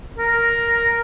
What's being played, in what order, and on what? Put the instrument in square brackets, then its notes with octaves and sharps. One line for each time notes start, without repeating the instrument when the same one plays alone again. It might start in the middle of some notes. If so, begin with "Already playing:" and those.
[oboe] A#4